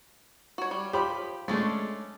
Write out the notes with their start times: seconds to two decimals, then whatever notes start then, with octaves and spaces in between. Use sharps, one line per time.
0.58 F#4 C#5
0.71 G3
0.93 F3 G4 B5
1.48 G#3 A3 C#4 D4